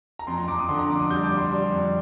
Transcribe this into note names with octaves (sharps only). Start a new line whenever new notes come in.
A#5
F2 C6
A#5
F2 D6
D#6
D3 C6
A#5
F2 D6
D#6
G3 G6
D6
G3
C6
G3
F2